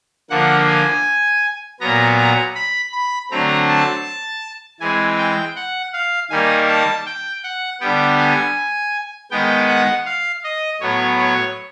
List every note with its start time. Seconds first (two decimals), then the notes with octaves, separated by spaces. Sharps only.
0.30 D3 F3 A#3 F#5
0.68 G#5
1.80 A#2 F#3 B3 A#5
2.17 A#5
2.55 B5
2.92 B5
3.31 D3 F#3 A3 C4 A#5
3.69 A5
4.80 E3 G#3 C4 G#5
5.18 G5
5.56 F#5
5.93 F5
6.30 D#3 G3 A#3 G#5
6.69 A5
7.06 G5
7.44 F#5
7.81 D3 G3 B3 G5
8.18 G#5
9.31 D#3 G#3 B3 G5
9.68 F#5
10.06 F5
10.44 D#5
10.81 A2 F#3 B3 C#5
11.18 C#5